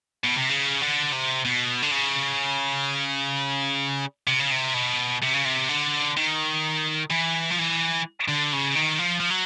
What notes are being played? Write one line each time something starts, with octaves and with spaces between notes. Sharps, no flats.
B2
C3
C#3
D3
C3
B2
D3
C#3
C3
C#3
C3
B2
C3
C#3
C3
D3
D#3
E3
F3
E3
D3
C#3
D#3
F3
F3
F#3